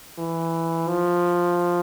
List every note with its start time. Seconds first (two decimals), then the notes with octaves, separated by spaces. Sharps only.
0.18 E3
0.88 F3